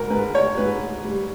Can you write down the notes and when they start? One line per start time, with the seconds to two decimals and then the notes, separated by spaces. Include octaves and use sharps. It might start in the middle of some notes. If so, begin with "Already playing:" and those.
Already playing: G#2 A#4
0.10 G#2 B4
0.35 C#5
0.57 G#2 B4
1.04 G3